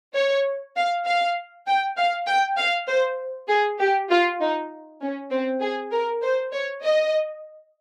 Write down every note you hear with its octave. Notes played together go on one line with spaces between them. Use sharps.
C#5
F5
F5
G5
F5
G5
F5
C5
G#4
G4
F4
D#4
C#4
C4
G#4
A#4
C5
C#5
D#5